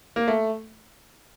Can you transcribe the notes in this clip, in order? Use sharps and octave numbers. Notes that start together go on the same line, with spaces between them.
A#3
A3